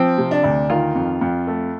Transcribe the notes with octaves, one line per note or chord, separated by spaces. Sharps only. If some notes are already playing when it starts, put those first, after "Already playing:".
Already playing: F3 C4
C3
D4
D2
D#3 F4
F2
F2
A3